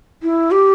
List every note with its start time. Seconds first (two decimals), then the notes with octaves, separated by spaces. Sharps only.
0.23 E4
0.51 G4